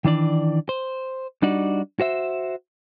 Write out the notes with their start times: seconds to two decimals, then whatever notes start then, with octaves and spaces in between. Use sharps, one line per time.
0.05 D#3 E3 D4 D5
0.69 C5
1.42 G3 D4 D#4 F#4 D5
2.00 F#4 C5 E5